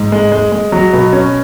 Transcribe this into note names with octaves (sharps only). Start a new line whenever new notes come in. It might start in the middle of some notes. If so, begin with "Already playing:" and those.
Already playing: G#2
G#3
G#3
G#3
F#3
B2
C#4